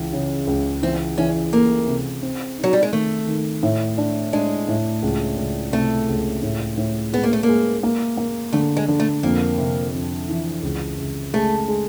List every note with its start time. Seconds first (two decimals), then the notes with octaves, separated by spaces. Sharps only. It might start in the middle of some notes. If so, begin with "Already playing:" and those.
Already playing: C#2 E3
0.13 C#3
0.47 C#2
0.82 E3 C4
1.18 E3 C#4
1.53 A3 A#3
1.88 C3
2.22 C4
2.58 D#4
2.63 F#3
2.73 G3
2.83 G#3
2.93 D#3 A3
3.27 D#3
3.63 A2
3.98 D4
4.33 G#3 D4
4.68 A2
5.02 C#2
5.38 C#2
5.73 C3 A3
6.09 C#2
6.43 A2
6.77 A2
7.13 G#3 B3
7.23 A#3
7.33 A3
7.43 A#3
7.49 G#3
7.83 A#3
8.17 A#3
8.53 D3 A3
8.77 G#3
8.88 D3
9.00 A3
9.23 F2 A#3
9.58 C3
9.93 F2
10.29 E3
10.63 C#2
10.98 C#2
11.34 G#3 A3
11.68 G#3